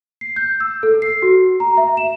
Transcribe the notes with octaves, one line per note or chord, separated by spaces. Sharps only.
C7
G6
E6
A4
C7
F#4
A#5
E5
E7